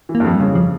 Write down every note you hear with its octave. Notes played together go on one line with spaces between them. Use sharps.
E3
A#3
G2
F2 F3
C#3 G3
F3